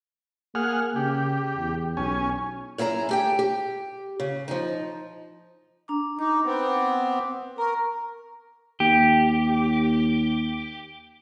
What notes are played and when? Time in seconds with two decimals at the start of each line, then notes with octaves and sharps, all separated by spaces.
0.55 A#3 G#4 F#5 F6
0.96 C#3 G4
1.57 E2
1.97 B1 C#4 G#5
2.78 F#2 E4 G#4 A#4 A#5
3.09 A3 G4 G5
3.39 G4
4.20 C#3
4.48 F3 D#4
5.88 D4 A#5 D6
6.19 D#4 D6
6.45 B3 C4
7.58 A#4 A#5 C#6
8.80 D#2 G4